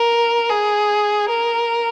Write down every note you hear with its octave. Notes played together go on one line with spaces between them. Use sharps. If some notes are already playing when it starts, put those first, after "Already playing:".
Already playing: A#4
G#4
A#4